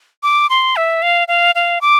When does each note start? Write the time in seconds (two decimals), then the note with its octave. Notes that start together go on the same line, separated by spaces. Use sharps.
0.23 D6
0.50 C6
0.76 E5
1.02 F5
1.28 F5
1.55 F5
1.81 D6